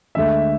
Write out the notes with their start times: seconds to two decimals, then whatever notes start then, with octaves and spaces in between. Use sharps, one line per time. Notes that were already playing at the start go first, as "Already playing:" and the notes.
0.15 D2 D3 G#3 E5